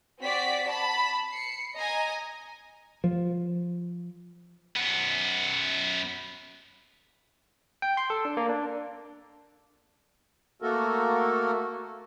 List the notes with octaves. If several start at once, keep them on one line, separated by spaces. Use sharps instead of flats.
C4 F#4 D5 B6
A5 B5
C7 C#7
D#5 G#5 A#5
F3
F#2 B3
G5
C6
A4
D4
A#3
D4
A3 A#3 F#4 A4 A#4